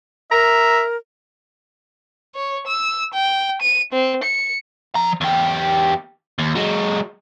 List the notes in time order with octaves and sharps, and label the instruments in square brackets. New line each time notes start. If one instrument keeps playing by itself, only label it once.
[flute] A#4 [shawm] E5 [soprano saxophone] A#5
[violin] C#5
E6
G5
D#7
C4
C#7
[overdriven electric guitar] F3 A#5
E2 G4
D#2
F#3 G#3